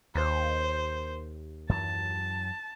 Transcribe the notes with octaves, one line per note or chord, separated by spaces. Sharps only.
D#2 C5
F#2 E3 F#3 A5